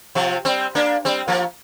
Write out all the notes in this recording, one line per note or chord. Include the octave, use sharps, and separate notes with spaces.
C3 F3
G3 C4
A#3 D4
G3 C4
F3 A#3